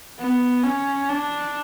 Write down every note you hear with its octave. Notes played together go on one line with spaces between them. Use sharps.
B3
C#4
D4